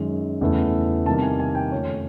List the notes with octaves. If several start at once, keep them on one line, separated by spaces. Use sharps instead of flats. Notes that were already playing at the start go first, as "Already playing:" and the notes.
Already playing: F#2 D#3 G#3
E2 C#3 E3 A3
C3 D#3 G3 A#3 A5
G#5
G#5
G5
F2 C#3 F3 A3 C#5